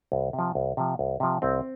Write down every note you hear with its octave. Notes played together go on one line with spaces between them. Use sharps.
C2
C3
F3
C2
C3 F3
C2
C3 F3
C2 C4